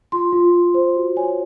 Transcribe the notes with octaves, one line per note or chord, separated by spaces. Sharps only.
F4 C6
F4
F4
C5
F#4
C#5 G#5